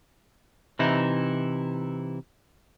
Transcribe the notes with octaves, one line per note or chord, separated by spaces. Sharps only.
C3 E3 D#4 E4